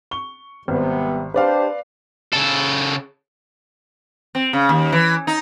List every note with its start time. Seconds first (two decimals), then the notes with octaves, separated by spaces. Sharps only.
0.11 C#6 G7
0.68 G#1 C3 G3 B3
1.34 D4 G4 B4 C5 D5 F5
2.32 C#3 A4
4.35 C4
4.53 C#3
4.69 D#2
4.92 E3
5.27 D#4